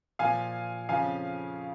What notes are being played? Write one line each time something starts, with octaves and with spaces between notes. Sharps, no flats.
A#2 F3 F5 G#5
F2 C#3 F3 F5 G#5